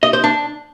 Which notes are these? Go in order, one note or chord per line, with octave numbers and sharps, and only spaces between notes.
D#5
C5
D4